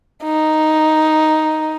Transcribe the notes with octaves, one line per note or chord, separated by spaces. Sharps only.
D#4